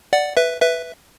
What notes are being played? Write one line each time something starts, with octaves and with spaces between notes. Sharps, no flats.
D5 F#5
B4 E5
B4 E5